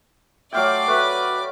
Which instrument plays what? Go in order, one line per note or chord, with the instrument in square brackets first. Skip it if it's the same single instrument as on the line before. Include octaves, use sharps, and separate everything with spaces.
[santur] F#3 F5 G5 [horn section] A3 E5 C6 [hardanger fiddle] D5 D6
[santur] A3 [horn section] F#4 B4